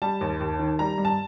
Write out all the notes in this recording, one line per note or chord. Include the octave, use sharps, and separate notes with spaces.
G3 A5
D#2
D#2
D#3
G3 A#5
G2
A5